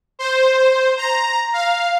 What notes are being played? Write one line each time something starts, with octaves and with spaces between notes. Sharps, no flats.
C5
A#5
F5